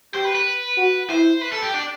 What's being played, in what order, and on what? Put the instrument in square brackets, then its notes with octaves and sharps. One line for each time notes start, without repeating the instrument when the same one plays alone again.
[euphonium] G4 [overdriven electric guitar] C5
[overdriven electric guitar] B4
B4
[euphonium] F#4
[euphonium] E4 [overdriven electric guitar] C5
[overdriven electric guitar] B4
A4
G4
D4